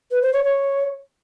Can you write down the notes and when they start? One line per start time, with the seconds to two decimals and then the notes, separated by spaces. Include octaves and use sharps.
0.11 B4
0.22 C5
0.33 C#5
0.44 C#5